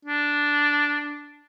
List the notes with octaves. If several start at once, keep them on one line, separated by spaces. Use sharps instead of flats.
D4